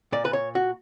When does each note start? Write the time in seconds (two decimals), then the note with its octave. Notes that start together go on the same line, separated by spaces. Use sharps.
0.12 A#2 D5
0.25 B4
0.33 C#5
0.55 F#4